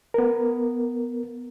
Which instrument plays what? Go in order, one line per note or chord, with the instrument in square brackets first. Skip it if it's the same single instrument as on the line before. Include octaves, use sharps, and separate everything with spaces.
[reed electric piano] B3 A#4